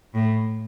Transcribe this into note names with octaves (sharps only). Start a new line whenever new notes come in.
A2